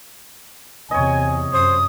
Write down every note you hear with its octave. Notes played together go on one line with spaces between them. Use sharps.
E2 C3 C#5 D#5 G#5
F#2 C5 D#6